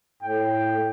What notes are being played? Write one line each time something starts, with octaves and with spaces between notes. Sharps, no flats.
A2 G5